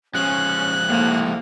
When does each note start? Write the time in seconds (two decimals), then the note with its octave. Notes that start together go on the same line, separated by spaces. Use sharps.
0.14 F3 G#3 C#4 F#6
0.89 C2 A2 A#3